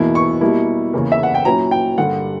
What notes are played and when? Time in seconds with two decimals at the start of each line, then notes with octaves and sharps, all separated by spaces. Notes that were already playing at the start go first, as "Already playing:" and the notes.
Already playing: E2 B2 A#3 E4
0.15 C#6
0.41 B2 G3 A#3 E4
0.93 E2 C#3 E3 A#3
1.12 E5
1.23 F#5
1.34 G5
1.45 A#2 F#3 C#4 E4 A#5
1.71 G5
1.97 G2 D3 G3 A#3 F#5